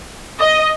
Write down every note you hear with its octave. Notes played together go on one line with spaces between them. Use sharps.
D#5